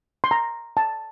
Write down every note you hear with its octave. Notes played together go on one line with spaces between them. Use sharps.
C6
A#5
A5